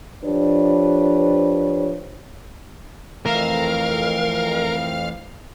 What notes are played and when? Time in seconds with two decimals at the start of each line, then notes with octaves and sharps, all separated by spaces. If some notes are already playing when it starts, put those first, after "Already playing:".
0.24 F3 D4 G4 B4 C#5
3.26 F2 E3 A3 A#4 E5 F5 F6